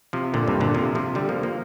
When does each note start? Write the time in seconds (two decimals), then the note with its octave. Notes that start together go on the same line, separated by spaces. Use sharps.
0.13 C3 F3
0.34 A#2 D3
0.48 G2 C3
0.61 A#2 D3
0.74 C3 F3
0.95 C3 F3
1.15 D3 G3
1.29 F3 A#3
1.43 F3 A#3